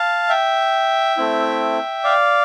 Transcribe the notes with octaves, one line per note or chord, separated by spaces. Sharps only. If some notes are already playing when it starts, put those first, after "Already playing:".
Already playing: F5 A5
E5 G5
A3 C4 E4
D5 F5